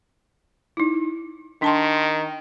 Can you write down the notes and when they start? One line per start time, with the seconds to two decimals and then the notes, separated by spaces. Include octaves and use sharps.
0.77 D#4 E4
1.62 D#3 D4 A5 C6